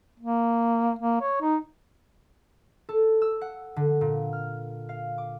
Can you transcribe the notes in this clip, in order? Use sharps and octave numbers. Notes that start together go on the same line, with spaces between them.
A#3
A#3
C#5
D#4
A4
E6
F#5
D3
A#2
F6
F5
D6